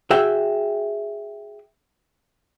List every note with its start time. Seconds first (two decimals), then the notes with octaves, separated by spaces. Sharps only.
0.11 F#4 G#4 E5 G5